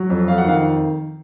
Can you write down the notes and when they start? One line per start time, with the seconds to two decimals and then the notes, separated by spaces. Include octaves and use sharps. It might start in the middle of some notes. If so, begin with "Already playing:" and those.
Already playing: F#3
0.10 F2
0.28 F2 F5
0.38 F#5
0.45 D#3 F5